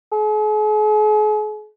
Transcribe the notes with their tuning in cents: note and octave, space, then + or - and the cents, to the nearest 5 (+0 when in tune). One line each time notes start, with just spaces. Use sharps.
G#4 +45